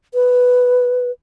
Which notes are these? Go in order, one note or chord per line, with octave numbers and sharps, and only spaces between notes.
B4